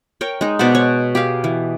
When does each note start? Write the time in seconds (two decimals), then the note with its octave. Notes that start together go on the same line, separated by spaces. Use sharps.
0.21 A#4 C#5 G5
0.41 G#3 D#4
0.59 B2 C5 D5 F#5
0.75 C#5
1.15 G4 G#4 F5
1.44 E3